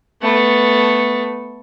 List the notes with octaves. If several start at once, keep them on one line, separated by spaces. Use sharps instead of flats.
A3 B3